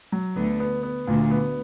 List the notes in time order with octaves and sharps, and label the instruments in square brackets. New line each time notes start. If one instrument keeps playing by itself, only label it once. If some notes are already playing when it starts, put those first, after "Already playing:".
[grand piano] F#3
[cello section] D2 D3 [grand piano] B3
[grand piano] B3
B3
[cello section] D2 D3 [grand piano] A#2
[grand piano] B3